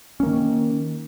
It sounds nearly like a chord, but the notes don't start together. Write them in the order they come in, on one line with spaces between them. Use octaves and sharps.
C#4 A#3 D#3